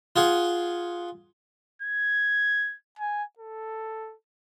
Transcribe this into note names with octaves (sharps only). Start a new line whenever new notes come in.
F4 G#4 F#5
G#6
G#5
A4